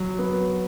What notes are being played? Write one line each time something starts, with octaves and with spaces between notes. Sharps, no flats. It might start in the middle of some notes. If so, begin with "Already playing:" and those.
Already playing: F#3
B3